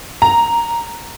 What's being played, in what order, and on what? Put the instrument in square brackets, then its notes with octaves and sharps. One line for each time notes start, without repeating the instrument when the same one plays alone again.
[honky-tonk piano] A#5